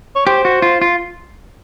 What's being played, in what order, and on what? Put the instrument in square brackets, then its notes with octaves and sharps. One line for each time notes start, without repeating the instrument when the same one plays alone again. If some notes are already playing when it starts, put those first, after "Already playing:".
[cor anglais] C#5
[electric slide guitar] G4 [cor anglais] C5
[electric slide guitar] F#4
F4
F4